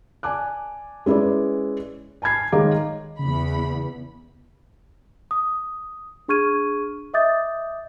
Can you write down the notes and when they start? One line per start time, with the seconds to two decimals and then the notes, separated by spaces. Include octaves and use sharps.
0.23 D5 G#5 A5 D6 F#6
1.06 G#3 C#4 E4 B4 D5
2.22 G#5 A5 B5 G#6 C7
2.52 D#3 G#3 C#5 F5 A#5 D6
3.19 E2 C#3 B5
5.31 D#6
6.28 D4 G#4 C#6 F6 G#6 D#7
7.14 D#5 E5 D6 D#6 G6 A6